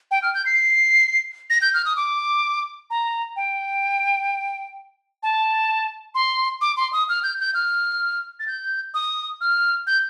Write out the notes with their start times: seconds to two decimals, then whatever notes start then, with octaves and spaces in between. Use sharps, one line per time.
0.11 G5
0.22 F6
0.34 G6
0.46 C7
1.50 A#6
1.62 G6
1.74 F6
1.85 D#6
1.96 D6
2.90 A#5
3.36 G5
5.23 A5
6.15 C6
6.61 D6
6.77 C6
6.93 D#6
7.09 F6
7.23 G6
7.40 G6
7.54 F6
8.40 A6
8.47 G6
8.94 D#6
9.41 F6
9.87 G6